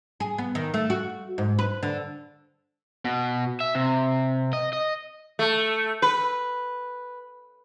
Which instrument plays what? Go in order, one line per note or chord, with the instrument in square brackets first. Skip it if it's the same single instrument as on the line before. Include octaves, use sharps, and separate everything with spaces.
[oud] G#4
B3
D#3
A3
F#4
G#2
B4
D3
[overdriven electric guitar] B2
E5
C3
D#5
D#5
[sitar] A3
B4